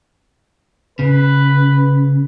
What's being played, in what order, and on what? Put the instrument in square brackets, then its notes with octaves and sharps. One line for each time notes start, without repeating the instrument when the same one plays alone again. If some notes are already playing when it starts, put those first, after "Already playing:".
[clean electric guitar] C#3 [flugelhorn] B4